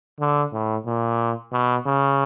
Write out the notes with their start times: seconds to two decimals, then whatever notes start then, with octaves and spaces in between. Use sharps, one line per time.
0.20 D3
0.53 A2
0.86 A#2
1.53 B2
1.86 C#3